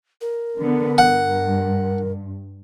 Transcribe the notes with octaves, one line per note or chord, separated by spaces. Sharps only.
A#4
D3 B3
G2 F#5